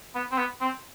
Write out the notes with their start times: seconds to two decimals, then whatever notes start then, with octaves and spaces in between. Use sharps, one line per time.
0.15 B3
0.31 C4
0.37 B3
0.61 C4